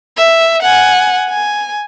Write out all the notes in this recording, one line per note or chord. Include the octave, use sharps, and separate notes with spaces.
E5
F#5 G#5
G#5